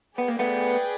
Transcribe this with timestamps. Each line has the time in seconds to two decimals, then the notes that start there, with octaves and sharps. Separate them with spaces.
0.18 B3 G#4 B4 D5 G5
0.28 A#3
0.39 A3 B3